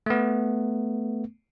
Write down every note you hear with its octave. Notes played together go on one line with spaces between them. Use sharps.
A3 B3